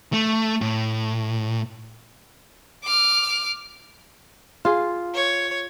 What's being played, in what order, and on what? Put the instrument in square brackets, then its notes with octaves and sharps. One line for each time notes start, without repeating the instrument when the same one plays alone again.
[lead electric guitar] A3
A2
[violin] D6 F6
[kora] F4 G#4
[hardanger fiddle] C#5